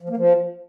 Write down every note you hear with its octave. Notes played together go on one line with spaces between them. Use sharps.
F3
A#3
F3